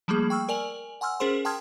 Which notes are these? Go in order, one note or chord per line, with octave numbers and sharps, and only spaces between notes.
F3 G3 A3 A#3 G#4
G5 C#6 E6 F6
A#4 D5 G#5 F7 F#7
F#5 G#5 C6 E6 F6
C#4 G#4 A#4 C5 C6
G5 A5 C6 D#6 F6 G#6